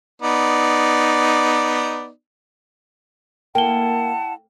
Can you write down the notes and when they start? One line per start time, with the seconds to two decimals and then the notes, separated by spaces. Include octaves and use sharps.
0.22 B3 D#4 D5
3.55 A#3 E4 F#5 G5 A5 G7